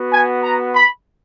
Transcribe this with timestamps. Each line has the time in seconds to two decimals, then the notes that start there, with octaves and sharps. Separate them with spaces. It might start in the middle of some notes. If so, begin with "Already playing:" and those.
Already playing: B3 F#4
0.12 G#5
0.43 A#5
0.75 B5